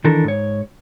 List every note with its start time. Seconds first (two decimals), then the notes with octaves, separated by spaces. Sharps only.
0.04 D#3 E3 D4 A4 A#4
0.24 G#2 C#5